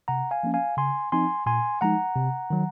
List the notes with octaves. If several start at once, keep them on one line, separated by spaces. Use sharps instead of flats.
C3 F#5 A#5
F5 G#5
F3 A#3 C#4
F5 G#5
C#3 G#5 C6
F3 C4 D#4 G#5 C6
A#2 G#5 C6
F3 G#3 D#4 F#5 A#5
C3
D#3 F#3